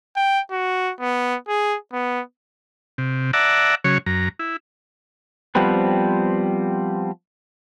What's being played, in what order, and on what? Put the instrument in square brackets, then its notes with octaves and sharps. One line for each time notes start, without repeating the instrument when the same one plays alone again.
[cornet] G5
F#4
B3
G#4
B3
[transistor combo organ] C3
D5 E5 F#5 A5 A#5
C#3 F#3 C#5
F#2 A#5
E4
[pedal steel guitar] F3 G3 B3 C4 B4